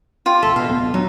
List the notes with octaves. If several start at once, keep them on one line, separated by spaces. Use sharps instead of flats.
F4 G4 D5
E1 A#1 A4 E5
B2 F5
D1 A#2 B3
F#3 D4 D#4